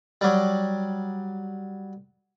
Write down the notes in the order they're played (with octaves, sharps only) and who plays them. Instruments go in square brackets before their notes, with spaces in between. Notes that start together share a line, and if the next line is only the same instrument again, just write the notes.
[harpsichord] F#3 G3